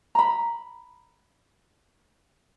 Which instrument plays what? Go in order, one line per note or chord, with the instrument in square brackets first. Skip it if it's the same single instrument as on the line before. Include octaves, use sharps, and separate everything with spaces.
[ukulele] A#5 B5